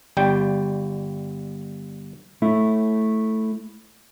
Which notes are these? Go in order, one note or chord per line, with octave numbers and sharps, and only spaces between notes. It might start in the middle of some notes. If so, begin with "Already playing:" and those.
G1 G3 G5
A3 E4